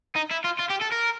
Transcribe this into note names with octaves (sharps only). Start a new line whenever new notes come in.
D#4
E4
F4
F4
G4
A4
A#4